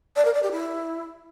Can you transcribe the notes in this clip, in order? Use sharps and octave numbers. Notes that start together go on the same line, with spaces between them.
D5
A#4
D5
G4
E4